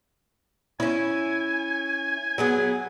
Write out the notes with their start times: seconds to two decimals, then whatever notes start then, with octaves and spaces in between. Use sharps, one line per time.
0.80 C#4 E4 G#5
2.38 F#3 B3 G#4